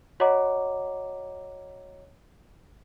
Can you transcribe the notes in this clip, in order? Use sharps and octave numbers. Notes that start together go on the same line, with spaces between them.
F#4 C#5 D#5 F#5 A#5 D6